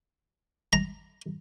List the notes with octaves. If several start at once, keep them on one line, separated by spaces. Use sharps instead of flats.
A#5